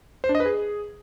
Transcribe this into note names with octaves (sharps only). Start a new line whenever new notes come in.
C5
D4
D#5
B4
G#4